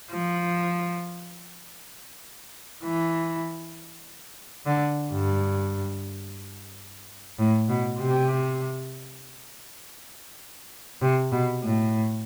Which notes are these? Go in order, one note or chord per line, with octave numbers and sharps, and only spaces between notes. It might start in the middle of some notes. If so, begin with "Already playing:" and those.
F3
E3
D3
G2
A2
B2
C3
C3
B2
A2